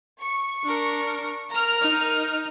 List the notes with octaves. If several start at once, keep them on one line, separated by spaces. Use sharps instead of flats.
C#6
D4 A#4
A#4 A#5 F6
D#4